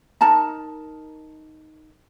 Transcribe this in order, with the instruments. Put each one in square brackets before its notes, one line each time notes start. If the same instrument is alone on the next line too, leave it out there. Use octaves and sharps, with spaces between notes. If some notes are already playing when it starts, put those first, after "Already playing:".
[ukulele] D#4 A#4 A5 A#5